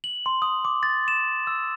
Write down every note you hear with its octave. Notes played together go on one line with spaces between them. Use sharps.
F#7
C6
D#6
D6
A6
E7
E6